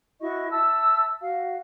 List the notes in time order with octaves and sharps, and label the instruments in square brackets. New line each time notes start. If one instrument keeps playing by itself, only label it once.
[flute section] E4 F#4 D#5 C#6
E5 A5 E6
F#4 F5